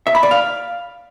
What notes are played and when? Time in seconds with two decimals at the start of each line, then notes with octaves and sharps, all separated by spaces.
0.07 E5
0.15 B5
0.23 D5
0.31 F5